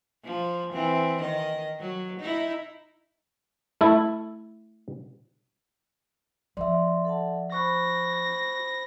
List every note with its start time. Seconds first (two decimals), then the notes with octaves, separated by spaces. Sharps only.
0.25 F3
0.73 E3 C4
1.20 D#3 D#5
1.79 F#3
2.20 D#4 E4
3.81 A3 E4 A4
6.57 F3 D5 E5 C6
7.05 A4 F#5 A5
7.52 C5 B5 C#6 F#6 A#6